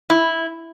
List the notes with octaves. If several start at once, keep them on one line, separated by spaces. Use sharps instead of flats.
E4